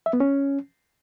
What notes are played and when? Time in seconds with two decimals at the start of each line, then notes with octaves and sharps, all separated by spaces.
0.06 E5
0.13 B3
0.20 C#4